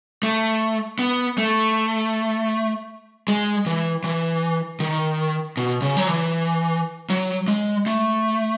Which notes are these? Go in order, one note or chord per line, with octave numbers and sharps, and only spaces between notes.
A3
B3
A3
G#3
E3
E3
D#3
B2
C#3
F#3
E3
F#3
G#3
A3